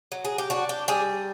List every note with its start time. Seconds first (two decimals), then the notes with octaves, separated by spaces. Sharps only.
0.12 F#3
0.25 G#4
0.38 G4
0.50 D4 F#4
0.69 G4
0.88 G3 G#4